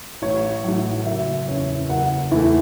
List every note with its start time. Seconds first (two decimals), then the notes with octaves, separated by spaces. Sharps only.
0.22 A1 C#5
0.64 A2 F#3
1.06 F#1 E5
1.48 E2 C#3 C#5
1.90 F#1 F#5
2.31 E2 E3 A3 E4